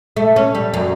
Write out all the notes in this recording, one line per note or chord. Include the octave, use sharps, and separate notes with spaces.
A3
C#4
G3
F#2